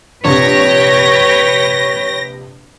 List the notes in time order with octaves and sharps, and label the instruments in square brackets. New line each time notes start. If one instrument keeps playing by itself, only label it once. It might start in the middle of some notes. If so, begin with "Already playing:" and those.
[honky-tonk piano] A#1 C3 [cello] B4 G5 [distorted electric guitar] C#5 [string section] A#6